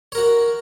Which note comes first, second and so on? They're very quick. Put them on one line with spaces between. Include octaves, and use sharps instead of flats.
C#5 A#4 F#4